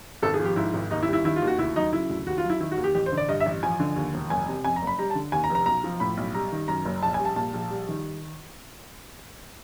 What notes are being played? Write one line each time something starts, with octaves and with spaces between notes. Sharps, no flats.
G#1 A4
G#4
F3
G4
G#2 E4
G#1
D#2 D#4
E4
G3
E4
D#3 E4
F4
D#2
F#4
D2 E4
F#3 D#4
C#3 E4
D2
D#2 F#4
F4
F#3
E4
D#3 E4
F#4
D#2
G4
A1 G4
C5
D3
D5
G2 D#5
E5
A1
F3 G#5
D3
D#2
E1
F#1 G#5
C3
F2 G#5
A#5
F#1
B5
G3 A#5
A5
D3
D#2 G#5
A#5
F1
A#5
B1 A#5
F3
A2 B5
B1
G3 A#5
D#3
F#2 A#5
F#1
A#1 A5
G#5
G3
A5
A#2 A5
A#1
G3
D#3